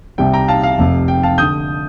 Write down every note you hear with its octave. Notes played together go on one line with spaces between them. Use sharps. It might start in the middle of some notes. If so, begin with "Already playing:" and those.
C2 C3 G3 G5
G5 A#5
F5 A5
F5
F1 F2 C3
G5
F5 A5
D3 D#6 G6